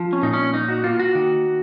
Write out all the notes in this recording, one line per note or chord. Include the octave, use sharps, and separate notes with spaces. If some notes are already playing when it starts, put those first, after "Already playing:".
Already playing: F3
C#4
A#2 D#4
C#4
A#3 D#4
F#4
A#3 F4
F#4
D#3